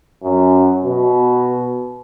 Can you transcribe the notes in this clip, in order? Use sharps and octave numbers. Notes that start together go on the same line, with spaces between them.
F#2
B2